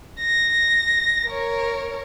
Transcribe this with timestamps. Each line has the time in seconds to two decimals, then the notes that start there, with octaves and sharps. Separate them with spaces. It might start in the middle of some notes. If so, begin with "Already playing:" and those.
0.20 A#6
1.28 A#4 C#5